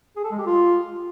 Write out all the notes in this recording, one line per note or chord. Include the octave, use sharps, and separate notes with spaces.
G#4
A4
G#3
G4
F4